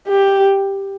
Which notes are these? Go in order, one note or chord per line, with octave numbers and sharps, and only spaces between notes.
G4